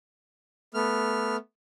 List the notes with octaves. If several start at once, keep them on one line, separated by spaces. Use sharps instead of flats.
A3 B3 F6